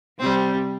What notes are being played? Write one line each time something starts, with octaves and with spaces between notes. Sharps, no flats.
C3 G3 C4